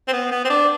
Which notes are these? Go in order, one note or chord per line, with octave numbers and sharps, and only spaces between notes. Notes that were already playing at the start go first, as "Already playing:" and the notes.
C4
B3
B3
C4
D4